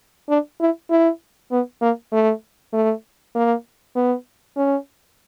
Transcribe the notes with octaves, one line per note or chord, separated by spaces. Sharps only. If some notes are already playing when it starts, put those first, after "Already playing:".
D4
E4
E4
B3
A#3
A3
A3
A#3
B3
C#4